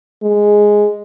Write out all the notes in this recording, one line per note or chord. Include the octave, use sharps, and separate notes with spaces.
G#3